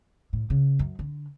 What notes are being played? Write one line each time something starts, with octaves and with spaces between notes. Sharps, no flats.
A2
C#3
F#2
D3